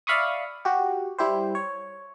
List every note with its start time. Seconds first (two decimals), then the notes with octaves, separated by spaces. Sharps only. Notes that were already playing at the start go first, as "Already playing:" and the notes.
0.07 D5 E5 F5 B5 C#6 D#6
0.65 F#4 G4
1.18 G3 E4 G4 C5
1.55 C#5